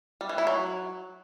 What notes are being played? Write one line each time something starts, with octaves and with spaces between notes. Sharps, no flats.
G3
E3
E4
F#3